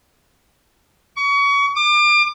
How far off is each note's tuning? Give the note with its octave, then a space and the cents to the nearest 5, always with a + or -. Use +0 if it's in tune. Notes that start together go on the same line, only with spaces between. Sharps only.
C#6 +30
D6 +35